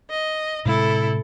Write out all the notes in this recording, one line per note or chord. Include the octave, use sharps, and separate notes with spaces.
D#5
A2 C3 G#3 E4 A4